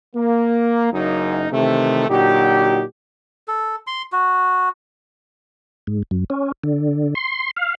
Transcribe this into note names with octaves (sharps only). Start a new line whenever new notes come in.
A#3
F#1 F#2 A#3 D#4
C3 D#3 E3 A3
A#2 D3 F#3 D#4 F#4 G4
A4
C6
F#4
G#2
F#2
C#4
D3
C6
F5